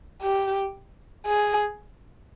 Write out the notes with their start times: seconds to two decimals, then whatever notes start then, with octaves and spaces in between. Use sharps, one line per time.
0.22 G4
1.26 G#4